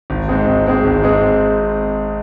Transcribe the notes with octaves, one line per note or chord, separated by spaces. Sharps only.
G#1
G#2 G#3 C4 G#4
G#1
G#2 G#3 C4 G#4
G#1
G#2 G#3 C4 G#4